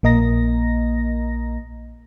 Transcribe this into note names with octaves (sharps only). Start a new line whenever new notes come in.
A#1 A#3 D#5 A#5 A#6